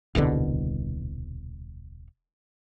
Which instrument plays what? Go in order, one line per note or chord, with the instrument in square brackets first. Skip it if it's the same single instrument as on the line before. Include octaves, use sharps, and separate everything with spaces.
[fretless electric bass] D#1 C2 B2 D3